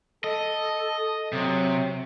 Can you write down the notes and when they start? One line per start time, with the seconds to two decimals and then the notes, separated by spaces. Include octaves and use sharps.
0.24 A4 D#5
1.32 C3 F#3